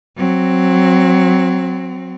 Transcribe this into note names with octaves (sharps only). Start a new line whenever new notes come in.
F#3 C4